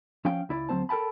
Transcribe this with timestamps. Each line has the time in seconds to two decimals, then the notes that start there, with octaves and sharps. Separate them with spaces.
0.25 F3 C#4 F5 G5
0.49 C#2 E4 D5
0.69 D2 F#3 C4 C5 A5
0.89 A4 A#4 G5 A5 B5